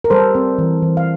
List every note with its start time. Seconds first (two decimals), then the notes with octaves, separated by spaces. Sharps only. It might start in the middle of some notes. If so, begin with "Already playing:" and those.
0.04 A#4
0.10 G3 A4 C5
0.35 C4
0.58 E3
0.82 E3
0.97 F5